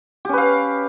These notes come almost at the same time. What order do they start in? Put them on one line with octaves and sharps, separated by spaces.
G4 C#4 B4 F5